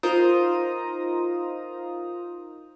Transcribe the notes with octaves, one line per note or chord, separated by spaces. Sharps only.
D#4 F4 A#4 C5 A#5 D#6